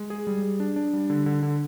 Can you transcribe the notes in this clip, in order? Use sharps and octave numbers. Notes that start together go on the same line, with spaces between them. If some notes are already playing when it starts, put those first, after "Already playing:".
Already playing: G#3
G#4
G3
G#4
D4
D4
G3
D3
D3
D3